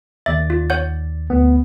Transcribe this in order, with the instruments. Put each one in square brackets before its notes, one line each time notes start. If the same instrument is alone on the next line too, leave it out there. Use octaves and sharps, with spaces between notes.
[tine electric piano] D#2 D5 A6 [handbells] E5
[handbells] F4
C#5 F#5 G6
[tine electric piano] D2 B3